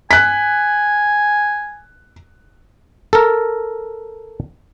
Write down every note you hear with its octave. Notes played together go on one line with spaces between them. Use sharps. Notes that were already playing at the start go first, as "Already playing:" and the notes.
G#5 F#6 B6
A4 A#4